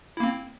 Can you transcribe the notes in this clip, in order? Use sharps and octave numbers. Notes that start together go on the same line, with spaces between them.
A#3 C4 E4